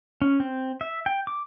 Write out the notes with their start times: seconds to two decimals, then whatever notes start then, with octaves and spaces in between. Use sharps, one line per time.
0.22 C#4
0.40 C4
0.81 E5
1.06 G5
1.27 D6